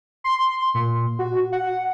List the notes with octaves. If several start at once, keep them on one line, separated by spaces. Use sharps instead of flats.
C6
A#2
F#4
F#5